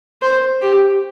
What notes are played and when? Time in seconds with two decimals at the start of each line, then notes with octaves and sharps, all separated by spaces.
0.22 C5
0.62 G4